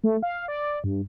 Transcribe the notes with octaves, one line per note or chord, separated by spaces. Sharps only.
A3
F5
D5
G2